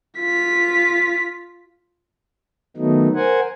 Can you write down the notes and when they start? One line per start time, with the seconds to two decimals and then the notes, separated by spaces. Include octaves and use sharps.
0.20 F4 B6
2.77 D#3 F#3 A3 B3 D#4
3.15 A#4 C5 F#5 G#5